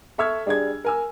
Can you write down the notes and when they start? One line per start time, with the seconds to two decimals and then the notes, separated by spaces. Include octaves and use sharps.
0.18 A4 E5 C#6 E6 F6 G#6
0.46 G3 D4 G#4 D5 G#6
0.84 A#4 G#5 E6